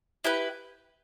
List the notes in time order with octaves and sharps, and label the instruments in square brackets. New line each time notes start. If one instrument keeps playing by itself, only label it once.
[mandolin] E4 G4 B4